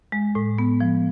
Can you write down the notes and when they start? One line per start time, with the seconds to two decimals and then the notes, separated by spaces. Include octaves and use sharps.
0.12 G#3
0.35 A2
0.58 B3
0.80 F3